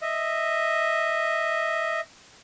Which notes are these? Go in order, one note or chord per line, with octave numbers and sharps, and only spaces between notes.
D#5 E5